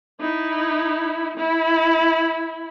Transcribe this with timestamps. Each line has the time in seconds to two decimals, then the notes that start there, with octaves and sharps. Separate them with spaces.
0.20 D#4 E4
1.37 E4